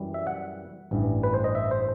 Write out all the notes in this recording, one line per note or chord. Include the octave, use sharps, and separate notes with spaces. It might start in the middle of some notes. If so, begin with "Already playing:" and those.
Already playing: F#2 E3 G3
E5
F#5
A1 G2 E3
B4
C5
D#5
E5
C5